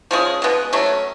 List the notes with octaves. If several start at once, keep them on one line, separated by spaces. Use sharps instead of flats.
F3 G#3 C#4 G#4
B2 G#3 B3
F#3 A3 C#4